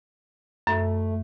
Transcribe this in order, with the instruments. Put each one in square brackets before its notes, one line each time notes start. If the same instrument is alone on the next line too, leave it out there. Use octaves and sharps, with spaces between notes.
[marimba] F#2 [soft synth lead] A3